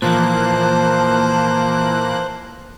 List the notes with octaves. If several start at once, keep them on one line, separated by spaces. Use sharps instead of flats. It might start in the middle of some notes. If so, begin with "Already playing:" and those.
A#2 E3 F3 A#3 C5 A5 F#6